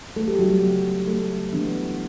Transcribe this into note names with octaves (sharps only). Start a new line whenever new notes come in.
A3 A4
G3 G4
F#3 F#4
G3 G4
C#3 G3 B3
A3 A4
E3 B3 D4